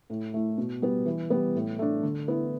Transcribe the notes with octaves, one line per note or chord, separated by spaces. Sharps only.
A2
A3 E4
B2
G3 B3
E3
G3 B3
A2
A3 D4
D3
B3 E4